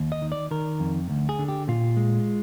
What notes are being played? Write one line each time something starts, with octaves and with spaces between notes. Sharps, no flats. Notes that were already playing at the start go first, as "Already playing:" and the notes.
Already playing: D#2
D#5
D#3
D5
D#3 A#4
F2
D2
G#4
D3
G4
A#2 F4
G#3